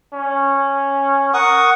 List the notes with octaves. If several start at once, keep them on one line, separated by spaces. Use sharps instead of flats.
C#4
A#4 F#5 C#6 D#6